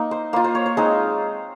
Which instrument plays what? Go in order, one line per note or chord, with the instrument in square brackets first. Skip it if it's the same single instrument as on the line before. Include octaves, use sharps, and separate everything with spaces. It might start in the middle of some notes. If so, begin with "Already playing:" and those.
Already playing: [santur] A#3 D#4
C5
A#3 F4 C5
C5
C#5
C#5
G#3 C4 D#4 C5